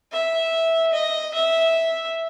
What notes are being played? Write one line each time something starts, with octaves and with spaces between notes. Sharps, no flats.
E5
D#5
E5